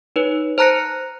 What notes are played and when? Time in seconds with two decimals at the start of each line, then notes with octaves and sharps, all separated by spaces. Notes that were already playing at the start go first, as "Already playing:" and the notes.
0.16 D#4 B4 C#5
0.58 C5 A5 A#5 F#6 A#6 C#7